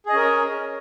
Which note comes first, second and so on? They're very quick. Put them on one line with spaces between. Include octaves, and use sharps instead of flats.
G#4 D#5 C#4 A#4 C#5